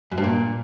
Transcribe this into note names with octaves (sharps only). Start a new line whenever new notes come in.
F#2
G2
A#2